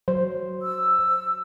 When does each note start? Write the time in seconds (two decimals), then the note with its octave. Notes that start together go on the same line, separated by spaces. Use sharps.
0.08 F#3 C5
0.62 E6